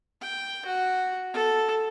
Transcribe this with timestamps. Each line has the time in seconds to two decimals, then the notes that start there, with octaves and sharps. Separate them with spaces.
0.21 G5
0.66 F#4
1.33 A4